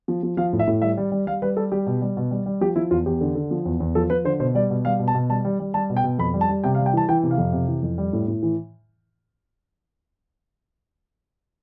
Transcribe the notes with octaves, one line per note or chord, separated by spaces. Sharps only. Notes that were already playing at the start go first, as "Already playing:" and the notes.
F3
F3
F3 F5
A2
E5
A2
G3 E5
G3
G3
G3 F5
G3 B4
G3 A4
G3 G4
B2
G3
B2
G3
G3
F3 G4
F3 E4
E2 F4
E2 G4
D3
D3
F3
E2
E2
F3 A4
F3 B4
D3 C5
B2 C5
G3 D5
B2
G3 F5
B2
A5
B2
G3 A5
G3
G3
G3 A5
B2
G5
B2
F2 B5
G3
A5
G3
C3 G5
F5
G3
G5
E3 A5
E3 G5
C3
F5
F2
C3
E3
F2
G3
A2
A2
E3